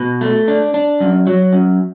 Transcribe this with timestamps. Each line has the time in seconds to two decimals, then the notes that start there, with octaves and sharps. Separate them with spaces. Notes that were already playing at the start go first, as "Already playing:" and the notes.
Already playing: B2
0.21 A3
0.48 D4
0.74 D4
1.00 F#2
1.27 F#3
1.53 F#2